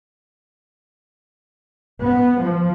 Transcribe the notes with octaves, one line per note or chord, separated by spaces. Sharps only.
B3
F3